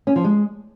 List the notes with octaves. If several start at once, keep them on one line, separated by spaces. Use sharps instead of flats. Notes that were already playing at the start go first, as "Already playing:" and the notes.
C#4
F3
G#3